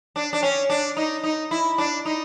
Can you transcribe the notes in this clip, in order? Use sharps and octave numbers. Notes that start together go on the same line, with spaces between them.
D4
D4
C#4
D4
D#4
D#4
E4
D4
D#4